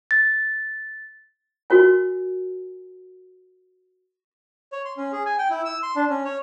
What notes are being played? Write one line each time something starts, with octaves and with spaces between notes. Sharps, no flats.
A6
F#4 A#4 C#5 G#5
C#5
C6
C#4
G#4
G#5
G5
E4
E6
C6
D4
C#4
C#5